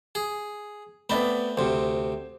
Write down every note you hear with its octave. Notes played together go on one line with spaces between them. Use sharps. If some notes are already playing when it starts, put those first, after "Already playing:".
G#4
A3 B3 C4 D5 B5
D2 C3 C5